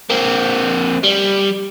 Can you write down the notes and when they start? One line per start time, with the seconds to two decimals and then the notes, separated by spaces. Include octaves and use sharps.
0.10 A#3 C4
1.03 G3